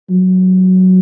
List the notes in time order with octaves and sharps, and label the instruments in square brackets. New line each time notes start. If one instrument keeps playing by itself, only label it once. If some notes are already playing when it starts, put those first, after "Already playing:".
[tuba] F#3